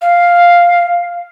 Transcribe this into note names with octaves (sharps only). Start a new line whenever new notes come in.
F5